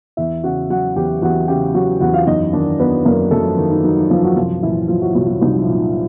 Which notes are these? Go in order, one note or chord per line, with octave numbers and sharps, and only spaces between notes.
E2 E4 E5
C#3 F#4 F#5
F#3 F#4 F#5
E2 G4 G5
E2 F#4 F#5
C#3 G4 G5
F#3 F#4 F#5
E2 F#4 F#5
F4 F5
F#2 D#4 D#5
D#3 D4 D5
F#3 B3 B4
F#2 A#3 A#4
F#2 A3 A4
F3 F4
D#3 D#4
D#4
F#3 D#4
D#4
F#2 F3 F4
F#3 F#4
C2 F3 F4
A#2 E3 E4
F3 F#3 F4
F#3 F#4
C2 F#3 F#4
F#3 F#4
C2 D#4
F3 F4
A#2
D#4